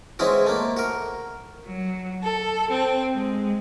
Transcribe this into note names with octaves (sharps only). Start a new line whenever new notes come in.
E3 G#3 C4 C#4 E4 F#4
A3 A#3
F#4 A#4
F#3
A4
C4
G#3